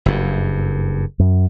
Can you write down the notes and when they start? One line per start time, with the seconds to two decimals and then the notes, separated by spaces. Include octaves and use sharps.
0.06 F#1 G2
1.19 F#2